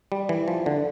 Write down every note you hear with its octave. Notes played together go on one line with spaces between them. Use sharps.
G3
E3
F3
D3